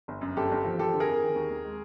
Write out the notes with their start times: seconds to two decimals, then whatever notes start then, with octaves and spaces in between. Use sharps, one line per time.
0.08 G1
0.21 F#2
0.37 G1 G4 A4
0.51 G1
0.64 F3
0.78 F3 G4 A4
0.94 D3
1.00 G#4 A#4
1.07 F2
1.22 D#3
1.36 D#2
1.51 D#2
1.65 G#3